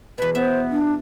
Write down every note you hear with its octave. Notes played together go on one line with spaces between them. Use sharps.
E2 B2 B4
B3 C5 E5
D4